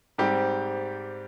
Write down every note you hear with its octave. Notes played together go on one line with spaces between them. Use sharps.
G#2 G3 C4 G4